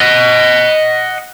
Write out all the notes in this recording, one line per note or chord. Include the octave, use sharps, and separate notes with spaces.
D#5 F#5